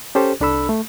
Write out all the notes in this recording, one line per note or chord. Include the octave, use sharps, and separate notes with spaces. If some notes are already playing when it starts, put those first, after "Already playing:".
C#4 G4 A4 C5
C2 D4 A4 B5 E6
A3